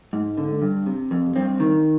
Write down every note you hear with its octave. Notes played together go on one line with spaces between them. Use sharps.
G#2
D3
G2
C3
F2
G2 C4
D#3